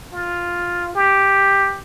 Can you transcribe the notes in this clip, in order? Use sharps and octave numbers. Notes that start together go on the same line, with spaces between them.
F4
G4